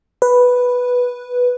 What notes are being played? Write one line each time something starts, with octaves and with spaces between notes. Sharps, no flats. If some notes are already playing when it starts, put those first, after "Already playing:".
B4